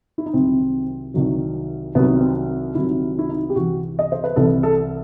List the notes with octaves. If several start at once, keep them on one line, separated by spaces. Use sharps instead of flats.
E4
D#4
C2 C3 D#3 F#3 C4
C2 C3 D#3 F#3
C2 C3 D#3 F#3 B3
C4
C2 C3 D#3 F#3 E4
E4
D#4
G4
C2 C3 E3 F#4
D#5
C5
B4
C2 C3 E3 A4
A4